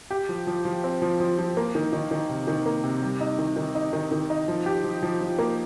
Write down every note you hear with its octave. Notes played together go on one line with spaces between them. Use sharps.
G4
F3
F3
F3
C4
F3
F3
F3
A#3
D#3
D#3
D#3
C3
D#3
A#3
C3
G3
D#4
D#3
D#3
D#4
D#3
D#3
D#4
F3
G4
F3
F3
F3
A#3